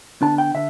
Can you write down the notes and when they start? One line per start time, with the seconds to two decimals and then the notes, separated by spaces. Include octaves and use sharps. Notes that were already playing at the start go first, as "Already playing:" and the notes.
0.22 D3 B3 D4 A5
0.38 G5
0.55 D3 E5